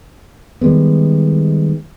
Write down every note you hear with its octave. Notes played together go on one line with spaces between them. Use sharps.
D#3 G3 G#3 B3